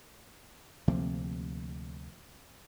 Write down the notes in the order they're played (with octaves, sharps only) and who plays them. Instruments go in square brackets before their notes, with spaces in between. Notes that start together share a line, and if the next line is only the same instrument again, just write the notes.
[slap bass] D2 C3 F3 A#3